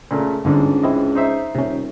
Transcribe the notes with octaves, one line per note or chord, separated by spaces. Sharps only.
A#2 C#3 A3
G1 C#2 G#2 D3
C4 E4 D#5
D#4 C5 E5
D#1 C3 C#4